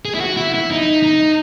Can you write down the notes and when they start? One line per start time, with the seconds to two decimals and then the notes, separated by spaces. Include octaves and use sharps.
0.05 G#4
0.15 E4
0.20 F#4
0.37 E4
0.54 E4
0.71 D#4
1.03 D#4